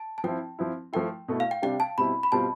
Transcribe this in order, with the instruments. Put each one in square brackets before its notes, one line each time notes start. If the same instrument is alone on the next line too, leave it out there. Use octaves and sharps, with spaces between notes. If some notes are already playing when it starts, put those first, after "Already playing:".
Already playing: [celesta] A5
A5
[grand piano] F3 C4 E4 [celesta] G5
[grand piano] F3 C4 E4
[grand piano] F3 A3 E4 [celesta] G5
[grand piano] B2 A3 E4
[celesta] F5
G5
[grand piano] C3 G3 D4 [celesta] G5
[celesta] A5
[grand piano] B2 G3 C4 E4 [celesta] B5
[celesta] B5
[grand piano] B2 G3 C4 F4 [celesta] A5